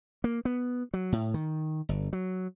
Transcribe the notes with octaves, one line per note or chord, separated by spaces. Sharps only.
A#3
B3
F#3
A2
D#3
G1
F#3